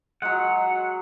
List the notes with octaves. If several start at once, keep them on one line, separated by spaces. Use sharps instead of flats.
F#3 G#3 F#5